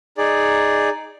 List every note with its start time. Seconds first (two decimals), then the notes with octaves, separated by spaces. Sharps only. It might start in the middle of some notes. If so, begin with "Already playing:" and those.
0.18 D#4 G#4 D5